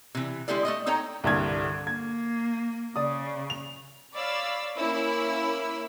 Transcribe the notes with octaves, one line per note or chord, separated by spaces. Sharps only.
C3 E3
D3 G#3 E4 G4 A4 D5
A3 D5 D#5
D#4 A4 C#5 D#5 G5 A#5
C2 G2 D3 G#6
A#3 G#6
C#3 D5 D#6
F7
C#5 D5 F5 B5 E6
A#3 C#4 E4 B5 E6